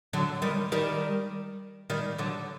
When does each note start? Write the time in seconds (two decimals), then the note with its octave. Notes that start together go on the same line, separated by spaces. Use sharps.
0.13 D3 F#3
0.42 D#3 G3
0.72 D#3 G3
1.90 D#3 G3
2.18 D3 F#3